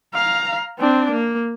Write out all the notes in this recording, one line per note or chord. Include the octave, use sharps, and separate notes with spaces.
F5 A#5
C4 D4
A#3